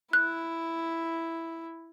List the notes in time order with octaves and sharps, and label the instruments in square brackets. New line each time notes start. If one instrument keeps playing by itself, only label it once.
[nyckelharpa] E4 [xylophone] F#6